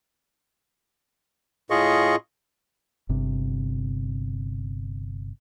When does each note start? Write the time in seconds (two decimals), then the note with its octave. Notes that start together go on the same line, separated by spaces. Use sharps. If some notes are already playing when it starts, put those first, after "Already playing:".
1.70 A2 F4 G#4 D#5 C#6
3.09 G1 C3